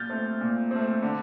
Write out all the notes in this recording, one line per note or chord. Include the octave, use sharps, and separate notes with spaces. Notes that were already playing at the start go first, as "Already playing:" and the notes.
Already playing: A#2 F6 G6 A6
A3 C4
A#2
A3 C4
D3